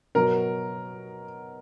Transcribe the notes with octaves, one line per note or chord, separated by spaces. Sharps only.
B2 F#3 B3 A#4